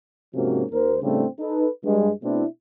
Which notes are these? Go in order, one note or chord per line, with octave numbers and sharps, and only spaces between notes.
G#2 C3 F3 A#3 C#4 F#4
D#2 A#4 C5
A2 C#3 G3 A3 C4 D4
D#4 A4 B4
G2 G#3
B2 A3 C4 D4 E4